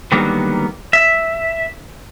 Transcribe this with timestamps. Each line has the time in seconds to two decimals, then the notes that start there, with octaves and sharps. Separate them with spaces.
0.12 D3 D#3 F#3 G3 A#3 B3
0.93 E5